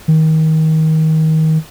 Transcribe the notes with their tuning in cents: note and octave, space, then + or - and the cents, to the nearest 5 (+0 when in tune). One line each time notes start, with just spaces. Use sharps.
D#3 +25